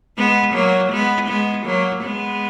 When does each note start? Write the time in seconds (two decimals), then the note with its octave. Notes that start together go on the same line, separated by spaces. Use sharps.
0.18 G#3 B3
0.54 F#3 A#3
0.92 G#3 B3
1.29 G#3 B3
1.66 F#3 A#3
2.03 G#3 B3